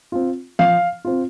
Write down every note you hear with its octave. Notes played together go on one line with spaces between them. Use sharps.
C4 F4
F3 F5
C4 F4